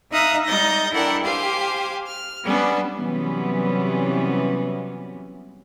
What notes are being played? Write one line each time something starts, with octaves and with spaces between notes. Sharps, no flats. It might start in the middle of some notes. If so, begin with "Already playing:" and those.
D#4 E5 F5 A#5 D#6 F#6
G3 D#4 G6 A6 A#6
D4 E4 A4 A#4 F#5 G5
G4 C5 F5 G#5
F6
G3 B3 C#4 D4
C3 E3 F#3 G3 B3 C#4